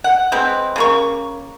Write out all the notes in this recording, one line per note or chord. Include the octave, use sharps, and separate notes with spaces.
F#5
G#3 C4 B4
C#3 A#3 C#6